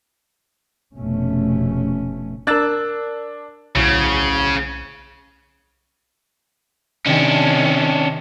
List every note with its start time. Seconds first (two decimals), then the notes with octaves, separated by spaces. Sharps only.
0.95 F1 B2 A3 C#4
2.47 D4 A#4 E6 F#6 A6
3.76 D1 B1 C#3
7.06 C3 D#3 C#4 D4